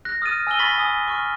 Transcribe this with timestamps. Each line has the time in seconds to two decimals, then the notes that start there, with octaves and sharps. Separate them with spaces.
0.05 F#6 A#6
0.22 D#6 F6 F#6 A6 D#7
0.47 G#5 E6 F6 A#6 D#7 G7
0.59 B5 C#6 A6 B6 F#7
0.78 G#5 D#6
1.07 C#6 F6